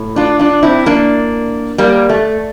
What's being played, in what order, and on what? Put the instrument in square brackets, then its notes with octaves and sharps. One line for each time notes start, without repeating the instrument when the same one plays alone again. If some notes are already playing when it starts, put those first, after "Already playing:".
Already playing: [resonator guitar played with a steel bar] A2
D4 F4
D4 F4
C4 E4
A#3 D4
G3 A#3
A3